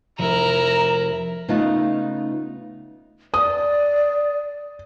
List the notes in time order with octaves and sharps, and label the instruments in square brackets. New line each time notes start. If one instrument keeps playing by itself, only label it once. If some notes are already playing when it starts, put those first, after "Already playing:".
[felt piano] F1 [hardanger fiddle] E4 [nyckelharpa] A#4 [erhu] A#5
[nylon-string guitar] C#3 A3 B3 D#4 F4
[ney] D5 [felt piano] D#6